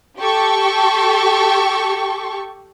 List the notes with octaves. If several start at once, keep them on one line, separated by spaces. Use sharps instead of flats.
G4 A4 C#6